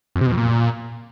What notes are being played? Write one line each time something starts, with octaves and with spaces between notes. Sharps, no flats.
F2
C3
B2
F2
A#2